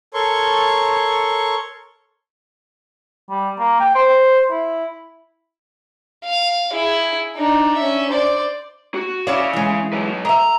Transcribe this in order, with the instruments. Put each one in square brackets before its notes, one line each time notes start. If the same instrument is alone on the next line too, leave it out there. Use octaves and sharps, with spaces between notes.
[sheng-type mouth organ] A4 A#4 C#5 C6 C#6
[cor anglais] G3
A#3
G5
C5
E4
[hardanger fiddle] F5
E4 G#4
D4 D#4
C#4 E5
C5 D5
[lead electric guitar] F#4
[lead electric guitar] C#4 F5 [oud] E4 C#5 D5
[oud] E3 G#3
[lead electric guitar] F#3 B4
[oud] D#5 E5 [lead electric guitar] A#5